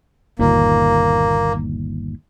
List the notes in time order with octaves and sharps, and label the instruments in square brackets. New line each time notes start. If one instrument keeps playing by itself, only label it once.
[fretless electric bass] G1 D#2 A#2 [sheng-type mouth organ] A#3